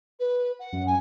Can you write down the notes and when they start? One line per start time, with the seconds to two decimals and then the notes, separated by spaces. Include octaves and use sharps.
0.20 B4
0.60 F#5
0.73 F#2
0.87 G#5